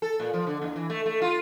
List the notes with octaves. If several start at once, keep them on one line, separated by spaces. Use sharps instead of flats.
A4
A#2
F3
D3
D#2
E3
A3
A3
F4